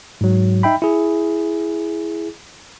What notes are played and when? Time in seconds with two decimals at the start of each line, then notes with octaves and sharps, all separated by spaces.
0.21 G#2 F#3
0.63 D#4 E5 G5 B5
0.82 E4 G#4